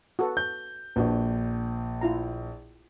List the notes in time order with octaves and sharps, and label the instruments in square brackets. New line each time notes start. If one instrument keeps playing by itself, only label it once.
[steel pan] F#4 A4 B4
[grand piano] G6
[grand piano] A#1 [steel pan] D4 F#4 B4
[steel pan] E4 F4 A#5